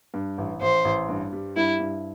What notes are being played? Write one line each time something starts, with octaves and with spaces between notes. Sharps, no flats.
G2
A1
A1 C5
A1
G2
G3
G2 E4
G2